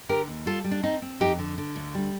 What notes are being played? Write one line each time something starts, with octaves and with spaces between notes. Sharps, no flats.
D3 G4 A#4
D#2
G3 F4 A4
G3
D4
C4 D#4
C4
F2 D#4 G4
D3
D3
D2
G3